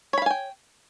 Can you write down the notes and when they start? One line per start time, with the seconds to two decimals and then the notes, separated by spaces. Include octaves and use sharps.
0.13 C#5
0.18 B5
0.22 F5
0.26 G#5
0.30 G5